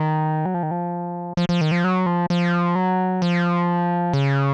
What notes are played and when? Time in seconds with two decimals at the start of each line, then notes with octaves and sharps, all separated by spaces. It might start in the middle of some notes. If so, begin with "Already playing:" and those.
Already playing: D#3
0.45 F#3
0.54 F3
0.63 D#3
0.71 F3
1.37 F3
1.49 F3
1.61 D#3
1.72 F3
1.84 F#3
2.06 F3
2.30 F3
2.75 F#3
3.22 F3
4.13 C#3